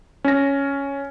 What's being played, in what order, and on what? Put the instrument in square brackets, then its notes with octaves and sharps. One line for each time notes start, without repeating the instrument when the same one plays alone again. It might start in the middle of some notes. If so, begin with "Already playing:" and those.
[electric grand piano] C#4 A#6